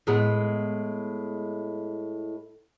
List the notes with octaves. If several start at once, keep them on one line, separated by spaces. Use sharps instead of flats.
A2 G#3 B3